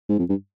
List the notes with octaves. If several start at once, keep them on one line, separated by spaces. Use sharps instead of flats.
G#2
F2
G2